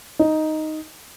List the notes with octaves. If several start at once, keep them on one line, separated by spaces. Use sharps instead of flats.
D#4